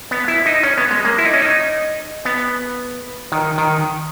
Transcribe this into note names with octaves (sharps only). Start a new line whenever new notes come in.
B3
E4
D#4
C#4
B3
G#3
A#3
E4
D#4
C#4
D#4
B3
D#3
D#3